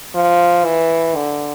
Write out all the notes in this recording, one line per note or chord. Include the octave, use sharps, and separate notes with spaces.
F3
E3
D3